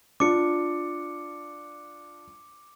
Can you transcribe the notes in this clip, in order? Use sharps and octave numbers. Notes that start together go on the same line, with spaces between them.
D4 F4 D6 C#7